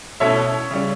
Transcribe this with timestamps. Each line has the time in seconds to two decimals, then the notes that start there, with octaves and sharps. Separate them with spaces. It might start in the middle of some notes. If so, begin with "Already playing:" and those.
0.20 B2 A3 C#4 E4 C#5 E5
0.71 C#3 G3 C#4